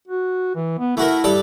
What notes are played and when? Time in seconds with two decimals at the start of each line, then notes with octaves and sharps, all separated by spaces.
0.08 F#4
0.55 E3
0.79 B3
0.97 A3 E4 F#4 A#4
1.24 G2 A4 D5